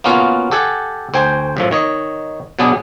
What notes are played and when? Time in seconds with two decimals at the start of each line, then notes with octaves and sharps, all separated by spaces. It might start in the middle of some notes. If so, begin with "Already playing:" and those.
0.04 A#3 B3 C#4 F4 F#4
0.51 G4 A4 F#5 G#5
1.14 D2 C5 G5 G#5
1.57 F#2 A2 F3
1.71 D#3 C#5 D#5
2.59 B2 F#3 B3 D4 G#4